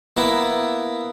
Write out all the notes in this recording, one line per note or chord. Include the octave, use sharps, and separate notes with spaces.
A#3 B3 E4